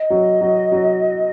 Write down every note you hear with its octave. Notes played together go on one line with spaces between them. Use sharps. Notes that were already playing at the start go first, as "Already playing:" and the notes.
Already playing: D#5
F#3
F#3
F#3